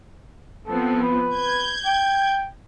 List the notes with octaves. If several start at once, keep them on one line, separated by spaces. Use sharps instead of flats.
F3 B3 C4 A4
B4
G6 G#6
G5